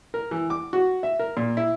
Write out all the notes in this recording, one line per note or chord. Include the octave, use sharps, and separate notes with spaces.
A#4
E3
D6
F#4
E5
A#4
A#2
E4